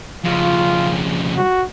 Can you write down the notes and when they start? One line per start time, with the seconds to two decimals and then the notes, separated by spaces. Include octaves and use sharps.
0.24 F2 C#3 F4
1.36 F#4